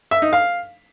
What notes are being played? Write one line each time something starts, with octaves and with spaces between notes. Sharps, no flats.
E5
D#4
F5